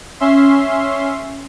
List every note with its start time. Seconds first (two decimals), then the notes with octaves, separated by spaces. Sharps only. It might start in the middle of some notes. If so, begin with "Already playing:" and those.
0.20 C#4 E5 C6